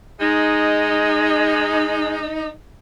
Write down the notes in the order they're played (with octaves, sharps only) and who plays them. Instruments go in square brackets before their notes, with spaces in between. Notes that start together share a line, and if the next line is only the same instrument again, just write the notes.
[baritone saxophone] G#3 [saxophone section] D#4